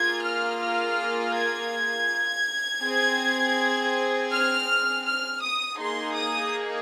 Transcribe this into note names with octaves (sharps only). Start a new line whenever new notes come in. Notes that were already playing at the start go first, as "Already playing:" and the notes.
Already playing: A#3 F4 G#4 G#6
F6
F6
G#6
C4 G#4
F6
F6
D#6
A#3 D#4 G#4 C6
D#6